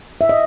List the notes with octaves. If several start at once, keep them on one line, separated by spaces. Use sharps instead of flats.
E5
D#5